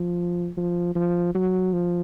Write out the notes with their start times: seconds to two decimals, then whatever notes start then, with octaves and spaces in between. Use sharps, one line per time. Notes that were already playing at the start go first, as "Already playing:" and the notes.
Already playing: F3
0.57 F3
0.96 F3
1.35 F#3
1.73 F3